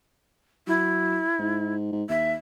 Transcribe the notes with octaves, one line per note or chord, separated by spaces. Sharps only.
F#3 E4
G#2
G#2
D#2 E5